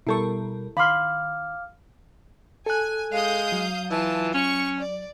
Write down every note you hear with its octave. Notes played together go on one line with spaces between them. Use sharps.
B2 G3 E4 A4 A#4 C#6
D#3 F5 B5 C6 D6 F6
A4 G#5 F#6
G#3 F5 D#6 G6
F#3
E3 F4 A5
C#4 C#6
D5